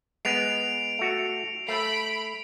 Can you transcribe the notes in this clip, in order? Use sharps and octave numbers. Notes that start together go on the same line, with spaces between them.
G#3 B3 C7 D7 F7
A3 F#4
A3 B5 C7 D7